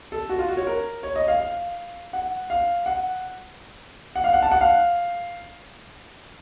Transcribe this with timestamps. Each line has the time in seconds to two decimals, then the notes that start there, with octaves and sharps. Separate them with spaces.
0.12 A4
0.29 F#4
0.39 F4
0.49 F#4
0.57 C#5
0.67 A#4
1.03 C#5
1.16 D#5
1.28 F5
1.40 F5
2.13 F#5
2.50 F5
2.86 F#5
4.16 F#5
4.24 F5
4.33 F#5
4.42 A5
4.52 F#5
4.61 F5